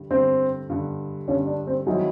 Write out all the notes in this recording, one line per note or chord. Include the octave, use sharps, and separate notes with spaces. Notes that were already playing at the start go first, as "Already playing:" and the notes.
Already playing: G2 D3 G3
G2 D3 G3 C4
G2 D3 G3
G2 D3 G3 C#4
D4
C4
D#3 F#3 G#3 C4 E4